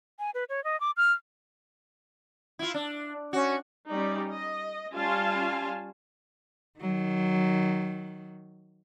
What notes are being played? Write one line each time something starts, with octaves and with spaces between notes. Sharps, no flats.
G#5
B4
C#5
D#5
D6
F6
E4 F4
D4
C#4 F#4
G3 C#4 D#4 D5
D#5
G3 C#4 F4 F5 G#5 A5
D#3 F#3